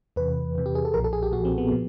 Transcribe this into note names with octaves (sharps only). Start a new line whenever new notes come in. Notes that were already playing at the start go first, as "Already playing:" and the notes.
E2 C3 E3 B4
E2 C3 E3
G4
G#4
A4
B1 A#2 F3 A#4
A4
G#4
G4
B1 A#2 F3 F#4
C4
B3
A#2 F3